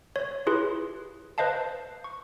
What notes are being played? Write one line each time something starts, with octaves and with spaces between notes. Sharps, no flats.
C#5
E4 F4 G4 G#4 B4 C6
B4 C5 D#5 F5 A5
C#6